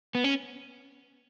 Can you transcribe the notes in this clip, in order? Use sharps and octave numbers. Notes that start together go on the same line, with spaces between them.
B3
C#4